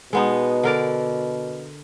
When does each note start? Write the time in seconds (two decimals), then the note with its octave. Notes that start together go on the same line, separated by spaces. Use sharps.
0.13 B2 G#3 B3 D#4
0.63 D3 A#4 D5